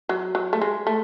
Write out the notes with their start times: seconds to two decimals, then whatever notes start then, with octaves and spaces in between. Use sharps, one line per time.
0.09 F#3
0.35 F#3
0.53 A3
0.62 G#3
0.87 A3